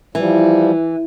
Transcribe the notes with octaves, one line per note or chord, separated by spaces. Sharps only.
E3 F3 G3